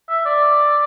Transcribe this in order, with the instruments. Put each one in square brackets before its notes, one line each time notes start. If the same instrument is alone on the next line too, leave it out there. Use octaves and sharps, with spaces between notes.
[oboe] E5
D5